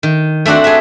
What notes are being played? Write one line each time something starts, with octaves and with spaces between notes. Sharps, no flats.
D#3
A3 C4 D4 F#4
G#4 E5